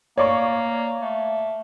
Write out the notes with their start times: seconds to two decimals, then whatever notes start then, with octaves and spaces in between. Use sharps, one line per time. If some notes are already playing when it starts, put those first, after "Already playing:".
0.18 A#3 C#5 D5 C#6
1.01 A3